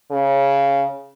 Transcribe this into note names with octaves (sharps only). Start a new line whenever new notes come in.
C#3